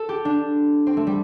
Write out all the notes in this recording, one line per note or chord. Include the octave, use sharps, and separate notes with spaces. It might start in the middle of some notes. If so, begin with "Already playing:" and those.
Already playing: A4
G4
D4
C4
A3
G3